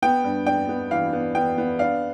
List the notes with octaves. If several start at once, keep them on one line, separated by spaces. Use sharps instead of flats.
B3 G5
G2
D4 G5
B3
E3 F5
B3
B3 G5
B3
D4 F5